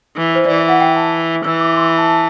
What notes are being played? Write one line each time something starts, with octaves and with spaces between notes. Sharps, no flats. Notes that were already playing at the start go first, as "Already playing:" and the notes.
E3
C5
E3 D5
E5
F#5
G5
A5
E3 E6
D6
D6
C6
B5
A5
A5